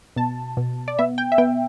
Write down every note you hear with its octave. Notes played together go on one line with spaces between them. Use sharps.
B2 A5
B2
D5
B3 E5
G5
E5
B3 G5